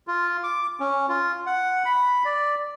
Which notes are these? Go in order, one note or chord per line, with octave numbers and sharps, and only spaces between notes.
F4
D6
C#4
F4
F#5
B5
D5